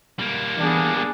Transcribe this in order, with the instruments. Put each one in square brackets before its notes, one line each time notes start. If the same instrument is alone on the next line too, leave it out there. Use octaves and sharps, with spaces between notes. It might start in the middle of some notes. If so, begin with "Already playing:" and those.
[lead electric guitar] G3 A#3
[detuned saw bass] E3 [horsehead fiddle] B3 G#4 [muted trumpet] D4